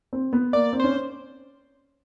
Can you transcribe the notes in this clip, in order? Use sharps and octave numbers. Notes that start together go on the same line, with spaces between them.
C4
B3
A#3 D5
C4
C#4 C5